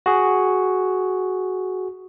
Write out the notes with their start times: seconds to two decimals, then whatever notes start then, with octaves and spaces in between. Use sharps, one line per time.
0.06 F#4 G#4